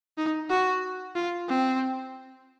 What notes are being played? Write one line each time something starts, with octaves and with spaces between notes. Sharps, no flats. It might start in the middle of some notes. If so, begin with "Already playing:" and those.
D#4
F#4
F4
C4